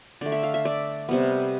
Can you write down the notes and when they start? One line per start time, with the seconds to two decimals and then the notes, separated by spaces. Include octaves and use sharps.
0.21 D3 A3 D5
0.32 E5
0.43 F5
0.54 E5
0.65 D5
1.09 C3 G3 B3